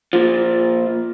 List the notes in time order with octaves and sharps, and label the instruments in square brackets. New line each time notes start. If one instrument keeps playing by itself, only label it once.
[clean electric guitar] A#2 F3